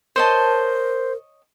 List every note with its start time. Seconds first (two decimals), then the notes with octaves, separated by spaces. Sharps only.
0.16 A#4 C5 C#5 D#5 A5